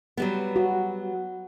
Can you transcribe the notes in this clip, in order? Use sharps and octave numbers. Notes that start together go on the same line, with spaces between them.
F#3 G3 B3
F#4